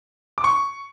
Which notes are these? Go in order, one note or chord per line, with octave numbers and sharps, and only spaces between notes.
D6
C#6